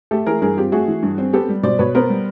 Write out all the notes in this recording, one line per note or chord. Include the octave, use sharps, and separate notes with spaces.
A3 G4 A4
E3 G#4 A#4
G2 G#4 A#4
C4 F4 G4
A3 F#4 G#4
E3
G2
C4
B3 G4 A4
G3
B2 C5 D5
B2 B4 C#5
B3 A#4 C5
G3